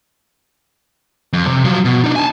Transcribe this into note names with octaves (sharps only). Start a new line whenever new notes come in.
F2
C3
F3 F#3
B2
D4 D#4
G#5 A5